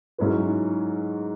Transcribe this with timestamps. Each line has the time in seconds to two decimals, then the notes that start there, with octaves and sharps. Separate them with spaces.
0.18 G#2 F#3 C#4 E4 B4